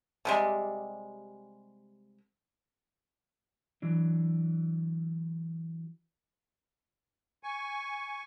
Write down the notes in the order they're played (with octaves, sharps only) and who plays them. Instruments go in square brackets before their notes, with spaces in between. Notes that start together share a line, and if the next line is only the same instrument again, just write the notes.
[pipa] C3 G3 G#3
[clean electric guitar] E3 F#3 D4
[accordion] G#5 C#6